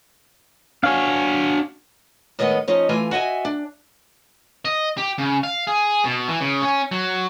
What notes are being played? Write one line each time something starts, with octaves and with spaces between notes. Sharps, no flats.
D4 F#4 C#5 F5 G#5
A2 D#3 G#3 B3 D#5
F3 C#4 D#4 D#5
E3 A3 F4 F5 G#5
F#4 D#5 E5 G#5
D4
D#5
G4
C#3
F5
G#4
B2
E3
C#3
C#4
F#3